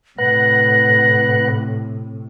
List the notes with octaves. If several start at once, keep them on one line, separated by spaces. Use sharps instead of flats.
A2 C3 B4 F#5 A#6